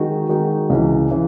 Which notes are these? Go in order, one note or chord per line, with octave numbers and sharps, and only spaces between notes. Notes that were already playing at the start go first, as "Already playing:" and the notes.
Already playing: D#3 G#3 D#4 F#4
D#3 G#3 D#4 F#4
C#2 C#3 E3
C#3 E3